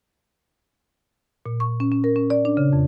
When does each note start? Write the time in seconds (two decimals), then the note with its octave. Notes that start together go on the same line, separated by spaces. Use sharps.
1.46 A#2
1.60 C#6
1.80 C#4
1.92 C#4
2.04 A#4
2.16 C#4
2.30 D5
2.45 D4
2.57 C#3
2.73 F2